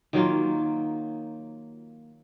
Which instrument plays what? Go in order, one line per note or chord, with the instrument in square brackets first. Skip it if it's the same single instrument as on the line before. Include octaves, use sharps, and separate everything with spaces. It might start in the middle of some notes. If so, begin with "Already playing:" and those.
[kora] D#3 F#3 A#3 F4